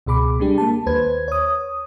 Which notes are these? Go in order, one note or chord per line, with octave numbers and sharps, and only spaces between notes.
C#2 B2 G#4 B5 D6
G3 G#3 D4 G4
A#3 A5
D#2 B4 C5 G#6
C#5 D#6